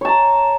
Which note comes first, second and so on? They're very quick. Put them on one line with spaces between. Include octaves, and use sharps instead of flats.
C#5 A5 A#5